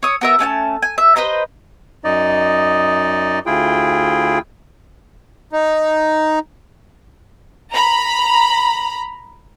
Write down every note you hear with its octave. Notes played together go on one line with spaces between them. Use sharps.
C#5 D#6
B3 A#4 E5
A3 C#4 G5 A5
G#5
E5
B4 C5 D#5 A#5
F#2 D#4 D5 D#5
D2 E4 F4 G#4 G5
D#4
A#5 B5